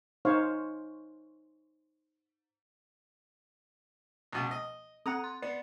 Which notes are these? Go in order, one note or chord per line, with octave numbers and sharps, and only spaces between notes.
D#4 C5 C#5 F5
C#2 B2
D#5
C4 F#5 A#5 D#6 F#6
C6
B3 D5 A6